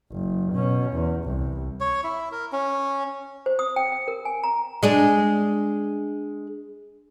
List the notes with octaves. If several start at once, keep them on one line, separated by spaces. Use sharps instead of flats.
F#1
B2 C#4
E2
C2
C#5
E4
A#4
C#4
C5
D#6
G5
G5
A#4
G#5
A#5
G#3 D4 G#4